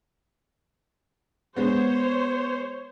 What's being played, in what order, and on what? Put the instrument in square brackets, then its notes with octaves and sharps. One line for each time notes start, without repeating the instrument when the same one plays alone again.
[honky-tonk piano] G#3 B3 [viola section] C5 C#5